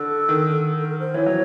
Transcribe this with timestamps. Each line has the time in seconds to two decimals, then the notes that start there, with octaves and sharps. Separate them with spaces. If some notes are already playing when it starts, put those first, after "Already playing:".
Already playing: D3 A4
0.29 D#3
0.78 A4
0.85 A#4
1.00 C5
1.14 E3 C#5
1.26 F#3